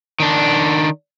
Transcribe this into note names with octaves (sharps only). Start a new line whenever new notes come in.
D#3 D4